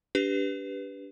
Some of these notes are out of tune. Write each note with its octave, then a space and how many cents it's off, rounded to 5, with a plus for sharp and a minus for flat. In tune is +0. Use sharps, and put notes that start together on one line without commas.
D4 -25 G4 +0 B4 +0